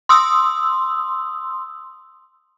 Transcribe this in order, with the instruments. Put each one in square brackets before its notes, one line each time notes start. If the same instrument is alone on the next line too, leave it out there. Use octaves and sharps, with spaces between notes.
[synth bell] C6 D#6 E6